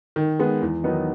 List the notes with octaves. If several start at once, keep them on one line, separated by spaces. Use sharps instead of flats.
D#3
G#3 B3
E2
D#3 F#3 B3 D#4